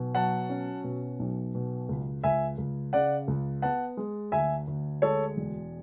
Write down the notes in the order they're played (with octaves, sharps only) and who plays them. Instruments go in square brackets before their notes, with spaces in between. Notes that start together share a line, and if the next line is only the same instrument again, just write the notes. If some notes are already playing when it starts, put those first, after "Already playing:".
Already playing: [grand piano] B1 B2
F#3 F#5 A5
C#4
B2
B1
B2
C#2
C#2 E5 G#5
C#2
C#3 D5 F#5
C#2
B3 F#5 A5
G#3
D2 E5 G#5
D2
G#3 A4 C#5
E1